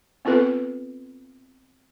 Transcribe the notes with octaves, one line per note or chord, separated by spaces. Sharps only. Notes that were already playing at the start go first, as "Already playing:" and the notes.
B3 C4 F4 A4 B4